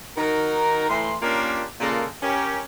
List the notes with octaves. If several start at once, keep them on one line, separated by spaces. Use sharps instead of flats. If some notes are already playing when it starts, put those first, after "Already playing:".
D#3 D#4 F#4 A#4
A2 E3 A#5 C6
A#3 C#4 D4 F4 G4 A#4
A#2 C#3 G#3 A#3 F4 A4
C#4 G4 A#4